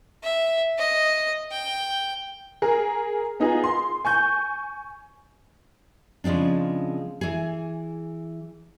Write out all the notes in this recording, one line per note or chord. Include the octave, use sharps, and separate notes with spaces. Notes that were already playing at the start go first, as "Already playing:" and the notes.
E5
D#5
G5
G#4 A#4
B3 D#4 F4 G#4
C6
G#5 C#6 G6
C#3 F3 G#3 C4 D4
E3 G#4